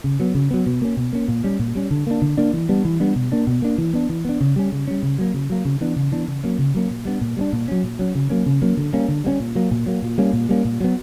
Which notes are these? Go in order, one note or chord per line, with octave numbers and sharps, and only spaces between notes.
C#3
F#3 B3
C#3
F#3 B3
B2
A#3 C#4
B2
A#3 C#4
A#2
G3 C#4
A#2
G3 C#4
D3
A#3 D4
D3
A#3 D4
E3
G3 B3 D4
E3
G3 B3 D4
B2
A#3 D4
B2
A#3 D4
E3
B3 D4
E3
B3 D4
C#3
G3 C#4
C#3
G3 C#4
C#3
F#3 A#3
C#3
F#3 A#3
C#3
E3 B3 D4
C#3
E3 B3 D4
C#3
F#3 A#3 C#4
C#3
F#3 A#3 C#4
A#2
G3 B3 D4
A#2
G3 B3 D4
A#2
F#3 C#4
A#2
F#3 C#4
C#3
F#3 A#3 C#4
C#3
F#3 A#3 C#4
D3
G3 A#3 C#4
D3
G3 A#3 C#4
A#2
F#3 A#3
A#2
F#3 A#3
A#2
G3 A#3 C#4
A#2
G3 A#3 C#4
A#2
F#3 B3